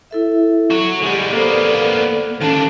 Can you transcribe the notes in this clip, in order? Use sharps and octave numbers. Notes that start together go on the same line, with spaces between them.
E4 A4 E5
F#4 C#5
G3 G#3 G4 F#5
A#3 B3 A4 C5 D5
D#2 C#4 D4 A4 A5